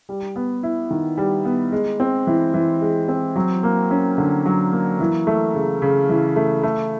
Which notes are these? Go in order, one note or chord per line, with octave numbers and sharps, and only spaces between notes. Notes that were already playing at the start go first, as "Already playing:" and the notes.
G3
B3
E4
D#3
G3
B3
G#3
C4
E3
E3
G#3
C4
F#3
A#3
C#4
D3
F#3
A#3
E3
A3
C#3
C#3
E3
A3
A3